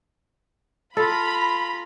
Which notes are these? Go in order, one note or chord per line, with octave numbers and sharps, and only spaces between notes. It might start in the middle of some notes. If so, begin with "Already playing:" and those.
F4 A4 A#5 B5